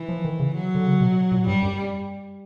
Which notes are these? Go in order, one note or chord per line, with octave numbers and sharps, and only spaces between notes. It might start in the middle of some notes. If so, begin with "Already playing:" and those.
Already playing: E3
F3
D#3
C#3
F#3
D3
C#3
B2
A#2
G2 G3
F#2